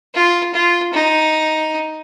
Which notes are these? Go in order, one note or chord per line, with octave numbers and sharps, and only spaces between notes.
F4
F4
D#4